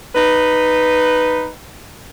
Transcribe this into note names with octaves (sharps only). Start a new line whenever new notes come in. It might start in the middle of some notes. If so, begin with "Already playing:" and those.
D#4 B4